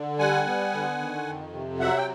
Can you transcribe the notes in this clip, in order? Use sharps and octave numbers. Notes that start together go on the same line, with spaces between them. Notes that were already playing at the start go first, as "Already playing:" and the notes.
Already playing: D3
G3 F#5 G#5
B3
D3
D#3
F2
C3
F#3 E5 F#5
G5